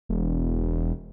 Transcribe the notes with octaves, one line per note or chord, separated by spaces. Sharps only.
E1